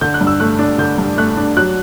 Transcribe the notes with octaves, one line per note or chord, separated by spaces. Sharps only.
D3 G6
F#6
G2
E6
A3 F#6
D4
D3 G6
G2
A3 F#6
D4
F#3 F#6